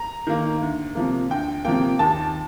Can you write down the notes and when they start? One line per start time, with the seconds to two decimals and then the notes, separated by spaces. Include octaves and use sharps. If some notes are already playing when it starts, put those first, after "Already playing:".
Already playing: A#5
0.27 D#3 A#3
0.61 D2
0.95 C3 F3 A#3
1.30 D2 G5
1.65 C3 F3 A#3 G5
1.99 D#2 A5